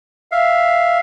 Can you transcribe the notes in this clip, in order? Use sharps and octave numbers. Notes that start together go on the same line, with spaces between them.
E5 F5